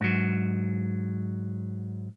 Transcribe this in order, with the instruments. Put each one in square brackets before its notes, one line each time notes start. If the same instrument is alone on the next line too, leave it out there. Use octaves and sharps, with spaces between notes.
[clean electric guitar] G#2 F#3